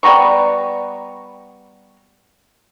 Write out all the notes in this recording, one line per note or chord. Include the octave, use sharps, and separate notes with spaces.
G3 B3 A#5 C#6